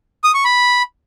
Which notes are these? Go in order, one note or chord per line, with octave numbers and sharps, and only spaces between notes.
D#6
C#6
B5